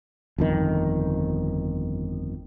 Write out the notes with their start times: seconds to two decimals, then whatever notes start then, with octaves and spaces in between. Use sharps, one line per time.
0.38 G1 F2 D#3